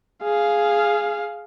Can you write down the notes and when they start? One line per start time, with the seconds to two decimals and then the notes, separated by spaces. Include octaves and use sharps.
0.23 G#4 F5